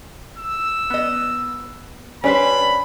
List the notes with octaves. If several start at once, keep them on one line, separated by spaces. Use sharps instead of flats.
E6
B3 D#5
G3 C#4 D4 B4 C5 B5